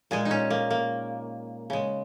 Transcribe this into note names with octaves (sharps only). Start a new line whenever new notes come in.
A#2 G#3 G#4
D#4
C#4
A#3
A#3
C#3 G#3